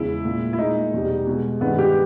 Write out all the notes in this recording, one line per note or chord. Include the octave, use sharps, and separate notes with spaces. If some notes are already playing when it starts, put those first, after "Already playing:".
Already playing: E2 C#3 G#3 E4
A#2 G#3
E4
A#2 G#3 D#4
E2 B2 G3
B2 G#3
G2 D#3 G#3 B3
G4